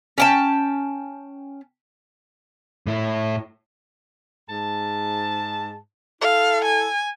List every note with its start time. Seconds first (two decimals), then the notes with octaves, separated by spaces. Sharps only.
0.18 C#4 G5 A5
2.87 A2 E4
4.49 G#2 A5
6.21 E4 A4 F5
6.65 G#5